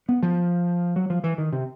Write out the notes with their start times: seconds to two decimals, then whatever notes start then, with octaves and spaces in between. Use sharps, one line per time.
0.09 B3
0.23 F3
0.96 F#3
1.10 F3
1.24 E3
1.38 D#3
1.53 C3